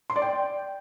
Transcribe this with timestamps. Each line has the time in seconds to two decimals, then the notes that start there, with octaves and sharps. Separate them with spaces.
0.10 C6
0.16 D5
0.22 G5